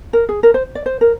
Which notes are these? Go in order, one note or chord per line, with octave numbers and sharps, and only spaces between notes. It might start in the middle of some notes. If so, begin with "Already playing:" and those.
A#4
G#4
A#4
C5
D5
C5
A#4